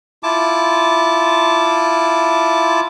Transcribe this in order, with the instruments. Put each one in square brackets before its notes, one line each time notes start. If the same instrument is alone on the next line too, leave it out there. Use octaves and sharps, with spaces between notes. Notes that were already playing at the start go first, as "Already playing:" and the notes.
[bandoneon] E4 F4 A5 D6